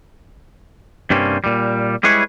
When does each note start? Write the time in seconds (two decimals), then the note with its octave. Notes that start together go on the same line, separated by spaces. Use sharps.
1.10 G2 C3 G3 A#3 C4 C#4
1.44 A#2 G3
2.03 G3 G#3 E4 G#4 B4 C#5